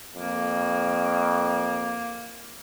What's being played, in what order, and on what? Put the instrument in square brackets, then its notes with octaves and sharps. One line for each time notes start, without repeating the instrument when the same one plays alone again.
[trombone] F2 [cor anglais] A#3